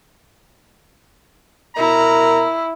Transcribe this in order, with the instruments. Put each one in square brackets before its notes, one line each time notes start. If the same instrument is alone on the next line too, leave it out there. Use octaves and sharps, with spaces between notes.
[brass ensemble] B2 A#4 A#5 [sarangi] E4